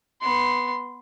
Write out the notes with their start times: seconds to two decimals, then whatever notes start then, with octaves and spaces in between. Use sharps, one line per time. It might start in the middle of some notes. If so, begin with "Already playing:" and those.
0.21 B3 C6